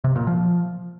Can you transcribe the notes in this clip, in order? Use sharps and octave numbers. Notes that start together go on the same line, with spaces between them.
C3
A#2
F3